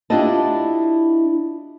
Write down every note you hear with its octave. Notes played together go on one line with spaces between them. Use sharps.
D4 E4 F4 G4 D#5 A5